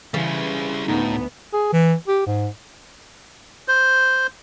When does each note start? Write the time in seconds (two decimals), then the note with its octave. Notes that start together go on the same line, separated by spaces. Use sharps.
0.14 C#3 E3 G3 E4
0.88 D2 A2 B3 D#4
1.53 G#4
1.73 E3
2.08 G4
2.27 G#2
3.68 C5